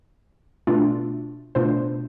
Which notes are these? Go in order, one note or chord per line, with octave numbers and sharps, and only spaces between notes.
B2 A3 D4 F4
B2 A3 D4 F4 C5